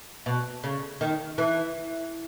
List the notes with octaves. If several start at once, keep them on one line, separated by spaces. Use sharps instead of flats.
B2
C#3
D#3
E3